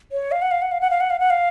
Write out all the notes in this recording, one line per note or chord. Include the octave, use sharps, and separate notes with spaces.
C#5
F5
F#5
F5
F#5
F5
F#5
F5
F#5
F5
F#5
F5